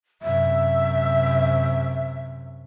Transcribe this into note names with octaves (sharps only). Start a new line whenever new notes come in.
F#2 C3 E5